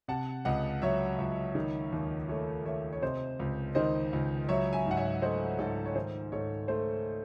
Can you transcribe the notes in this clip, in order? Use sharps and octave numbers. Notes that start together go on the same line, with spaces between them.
C3 F#5 A5
C#2 D#5 F#5
F#3 C#5 E5
C#2
D#3
D#2
A3 C#5 E5
D#2 C#5 E5
C#5
C3 C5 D#5
C#2
D#3 C5 D#5
C#2
F#3 C#5 E5
E5 G#5
G#2 F#5
C#5 E5
A3 C5 D#5
G#2 A4 C#5
C#5
D#3 C5
G#2 A4 C#5
A3 C5